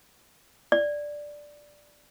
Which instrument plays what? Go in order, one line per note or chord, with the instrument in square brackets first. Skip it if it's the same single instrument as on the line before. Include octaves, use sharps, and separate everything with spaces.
[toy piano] D5